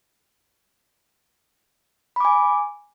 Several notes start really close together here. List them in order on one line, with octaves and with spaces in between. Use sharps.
B5 D6 G#5